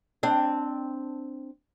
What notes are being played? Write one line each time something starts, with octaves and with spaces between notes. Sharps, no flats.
C4 D4